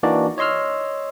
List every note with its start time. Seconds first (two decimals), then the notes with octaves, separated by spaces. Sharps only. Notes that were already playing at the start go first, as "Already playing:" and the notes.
0.03 E3 A#3 D4 D#4 F#4 D5
0.38 C#5 D#5 C6 E6 F6